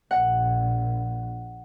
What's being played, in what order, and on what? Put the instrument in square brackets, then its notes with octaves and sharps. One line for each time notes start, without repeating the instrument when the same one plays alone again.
[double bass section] A#1 [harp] F#5